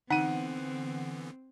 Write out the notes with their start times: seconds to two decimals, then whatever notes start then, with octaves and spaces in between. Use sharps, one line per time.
0.10 D3 E3 B3 C4 D#4 F#5 D#7